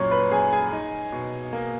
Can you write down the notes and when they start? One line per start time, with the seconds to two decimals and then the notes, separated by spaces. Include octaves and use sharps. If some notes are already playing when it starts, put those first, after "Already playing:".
Already playing: F#2 A#2 C#5 C#6
0.11 B4 B5
0.31 F#2 G#4 G#5
0.53 G#4 G#5
0.72 D#4
1.12 B2
1.53 A#3